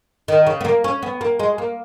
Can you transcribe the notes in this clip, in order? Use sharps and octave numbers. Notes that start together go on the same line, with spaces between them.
D#3
C#3
B3
A#3
C#4
B3
A#3
G#3
A#3